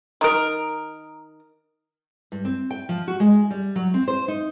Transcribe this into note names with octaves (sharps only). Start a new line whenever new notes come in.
D#3 A#4 A#5 D#6 D7
G2
C4
G5
F3
F#4
G#3
G3
F#3
C4
C5
D#4